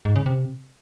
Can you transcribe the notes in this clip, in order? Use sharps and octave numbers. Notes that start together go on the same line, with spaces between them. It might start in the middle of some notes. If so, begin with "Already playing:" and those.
G#2
C#3
C3